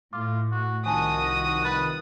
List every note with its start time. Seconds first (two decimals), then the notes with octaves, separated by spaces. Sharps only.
0.13 A2 F4 D6
0.52 F#4
0.86 C2 D#3 F3 F#4 G#5 A5 D#6
1.25 A#6
1.65 B4 A6